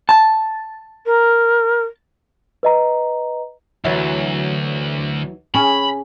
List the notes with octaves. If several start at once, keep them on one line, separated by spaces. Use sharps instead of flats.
A5
A#4
B4 D#5 A#5
D2 E3 F#3 E4
C#4 G#4 B5